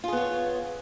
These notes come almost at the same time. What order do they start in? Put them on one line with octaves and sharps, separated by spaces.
F4 G#4 B3 C#5